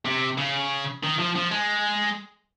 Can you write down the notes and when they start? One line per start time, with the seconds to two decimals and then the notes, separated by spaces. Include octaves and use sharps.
0.05 C3
0.38 C#3
1.03 D#3
1.19 F3
1.36 F3
1.51 G#3